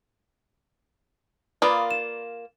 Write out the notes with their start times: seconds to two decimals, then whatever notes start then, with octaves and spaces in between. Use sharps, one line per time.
1.62 A#3 F4 A#4 B4 D5 B5 D#6
1.91 E7